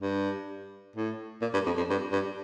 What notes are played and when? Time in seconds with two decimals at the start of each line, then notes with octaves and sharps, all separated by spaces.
0.02 G2
0.96 A2
1.42 A#2
1.54 G2
1.66 F2
1.77 F2
1.90 G2
2.12 G2